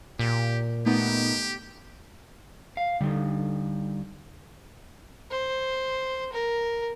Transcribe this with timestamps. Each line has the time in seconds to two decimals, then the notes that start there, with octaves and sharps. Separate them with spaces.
0.19 A#2 G4
0.86 A3 B3 D#4 G4
2.77 F5
3.01 D3 G3 D#4
5.30 C5
6.33 A#4